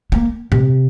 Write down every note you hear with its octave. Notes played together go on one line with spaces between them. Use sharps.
A#3
C3